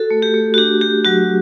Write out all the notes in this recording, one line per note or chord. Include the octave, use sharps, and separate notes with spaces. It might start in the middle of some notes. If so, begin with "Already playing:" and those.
Already playing: F#4 A4
A3
G4
A3
F#4
D4 G4
F#4 G4
F#3 F#4